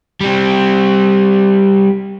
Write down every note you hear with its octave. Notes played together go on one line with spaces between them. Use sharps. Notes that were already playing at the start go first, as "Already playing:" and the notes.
G3 C4